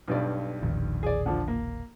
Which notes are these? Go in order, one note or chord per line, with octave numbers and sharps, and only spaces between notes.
B1 G2 D5
E1 A#1 D#3
G#4 D5
D3 F3
A#3